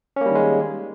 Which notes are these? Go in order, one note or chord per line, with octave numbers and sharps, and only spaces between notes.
D#3 G3 G#3 A#3 C#4